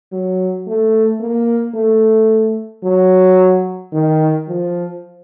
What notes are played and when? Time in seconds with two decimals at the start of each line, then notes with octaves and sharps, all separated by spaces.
0.12 F#3
0.67 A3
1.21 A#3
1.75 A3
2.84 F#3
3.93 D#3
4.48 F3